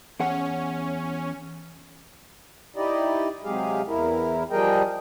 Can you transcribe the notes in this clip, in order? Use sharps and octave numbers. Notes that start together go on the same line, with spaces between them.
E2 C#4 G#4 F#5
D#4 E4 G4 D5 D#5
C3 F#3 G#3 G4 G#4 F5
E2 E4 A#4
F3 G3 G#4 A#4 D#5 G5